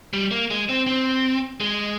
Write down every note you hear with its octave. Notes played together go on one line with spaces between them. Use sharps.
G3
A#3
G#3
C4
C4
G#3